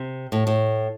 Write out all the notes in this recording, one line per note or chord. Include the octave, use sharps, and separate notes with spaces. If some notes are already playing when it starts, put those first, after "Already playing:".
Already playing: C3
A2
A2